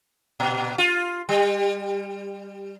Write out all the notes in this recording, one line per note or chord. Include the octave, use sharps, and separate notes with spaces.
A#2
F4
G3